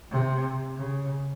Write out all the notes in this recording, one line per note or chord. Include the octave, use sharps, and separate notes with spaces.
C3
C#3